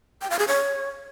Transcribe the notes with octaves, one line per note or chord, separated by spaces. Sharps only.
G5
F5
G#4
C#5